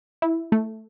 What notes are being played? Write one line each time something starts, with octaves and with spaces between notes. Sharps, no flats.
E4
A3